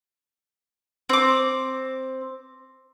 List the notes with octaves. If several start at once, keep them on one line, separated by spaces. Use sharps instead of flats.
C4 D6